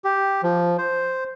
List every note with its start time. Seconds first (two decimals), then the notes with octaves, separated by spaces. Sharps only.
0.04 G4
0.43 F3
0.78 C5